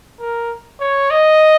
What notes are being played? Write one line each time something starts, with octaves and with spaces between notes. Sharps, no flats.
A#4
C#5
D#5